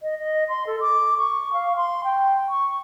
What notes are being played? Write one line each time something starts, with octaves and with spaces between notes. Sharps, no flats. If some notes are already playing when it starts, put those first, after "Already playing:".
D#5
D#5
C6
A4
D6
C#6
F5
C6
G5
C#6